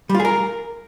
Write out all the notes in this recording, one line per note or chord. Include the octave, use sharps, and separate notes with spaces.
G3
F4
G#4
A#4